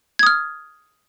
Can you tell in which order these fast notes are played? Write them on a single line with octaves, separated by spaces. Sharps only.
G#6 D#6 F6